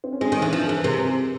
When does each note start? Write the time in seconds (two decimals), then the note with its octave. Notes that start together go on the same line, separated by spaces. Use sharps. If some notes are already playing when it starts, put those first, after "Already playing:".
0.04 C4
0.12 C#4
0.21 G#3 C4 D4
0.32 D#3
0.37 C#4 D#4
0.42 E3
0.52 F3 D4 E4
0.68 E3 G#4 A#4
0.84 C3 G#4 A#4